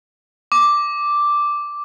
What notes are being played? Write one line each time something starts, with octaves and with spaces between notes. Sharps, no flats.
D6